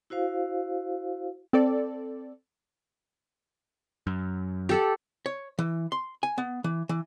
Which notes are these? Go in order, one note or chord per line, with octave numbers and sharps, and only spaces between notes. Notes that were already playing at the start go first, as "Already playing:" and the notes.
E4 F#4 C5 F5
C4 A4 D5
F#2
G4 A4 F#5
C#5
E3
C6
G#5
B3
E3
E3